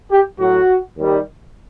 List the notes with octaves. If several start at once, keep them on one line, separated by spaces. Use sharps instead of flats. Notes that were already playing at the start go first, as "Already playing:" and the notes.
G4
A2 F#3 F#4
D#2 D#3 G3